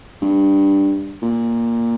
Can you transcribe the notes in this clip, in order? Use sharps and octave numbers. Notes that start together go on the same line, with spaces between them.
G2
A#2